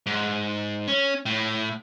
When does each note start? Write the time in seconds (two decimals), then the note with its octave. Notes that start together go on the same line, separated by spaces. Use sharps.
0.06 G#2
0.88 C#4
1.26 A2